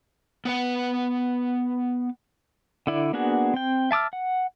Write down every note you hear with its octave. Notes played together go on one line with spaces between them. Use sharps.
B3 B4 F#5
D3 E4 D5
A#3 B3 D4 F#4 G#4
C4 G5
E5 A5 D6 E6 F6
F#5